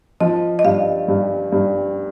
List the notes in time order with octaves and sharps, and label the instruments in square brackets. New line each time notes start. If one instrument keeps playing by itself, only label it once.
[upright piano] F3 [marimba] D#5
[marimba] D#5
[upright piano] G2 [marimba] F5
[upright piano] G2
G2